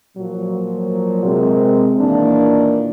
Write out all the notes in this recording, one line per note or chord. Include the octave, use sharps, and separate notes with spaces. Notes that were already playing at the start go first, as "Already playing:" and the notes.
A#2 F3 F#3
C3 G#3 C4 G#4 A#4
A#2 D#3 E3 A#3 D4